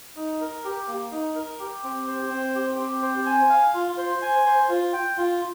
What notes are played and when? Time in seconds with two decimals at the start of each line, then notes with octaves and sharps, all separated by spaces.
0.16 D#4
0.41 A#4
0.65 G4
0.88 A#3
1.12 D#4
1.35 A#4
1.60 G4
1.84 C4
2.07 C5
2.30 C4
2.55 G4
2.79 C4
3.02 C5
3.26 G#5
3.49 F5
3.74 F4
3.97 C5
4.22 G#5
4.46 C5
4.69 F4
4.93 G5
5.17 F4